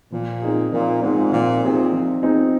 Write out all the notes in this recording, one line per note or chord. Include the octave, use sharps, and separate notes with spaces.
A#2 F3
C4 D#4 G#4
A#2 F3
G#2 C4 D#4 G#4
A#2 F3
C3 C4 D#4 G#4
F3
C4 D#4 G#4